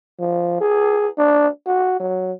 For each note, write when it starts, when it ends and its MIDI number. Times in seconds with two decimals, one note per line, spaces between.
0.20 0.59 53
0.61 1.09 68
1.18 1.48 62
1.66 1.96 66
2.00 2.32 54